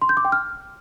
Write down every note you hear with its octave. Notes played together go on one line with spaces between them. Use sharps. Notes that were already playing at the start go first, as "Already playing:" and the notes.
C6
G6
D6
G5
F6